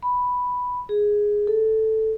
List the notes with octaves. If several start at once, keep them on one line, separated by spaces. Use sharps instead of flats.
B5
G#4
A4